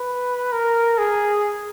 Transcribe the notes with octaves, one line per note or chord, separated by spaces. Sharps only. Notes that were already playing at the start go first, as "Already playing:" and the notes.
Already playing: B4
A#4
G#4